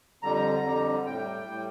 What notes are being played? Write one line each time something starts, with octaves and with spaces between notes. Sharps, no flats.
F2 D3 G3 A#5
F2 D3 G3
A2 G3 G5
A2 G3